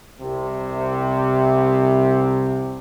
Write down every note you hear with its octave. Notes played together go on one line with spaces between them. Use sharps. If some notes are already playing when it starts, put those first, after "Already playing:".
C2 C3